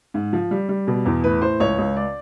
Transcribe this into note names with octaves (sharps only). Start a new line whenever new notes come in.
G#2
F3
G3
G3
B2
E2
A2 B4
E3 C5
C#2 C#5
C#2
D5